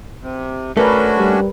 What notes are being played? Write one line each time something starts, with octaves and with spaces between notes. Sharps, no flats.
C3
A3 C#4 D4 F#4 A#4 B4
G3